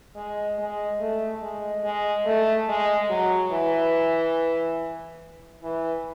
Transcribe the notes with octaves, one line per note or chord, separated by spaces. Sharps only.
G#3
G#3
A3
G#3
G#3
A3
G#3
F#3
E3
E3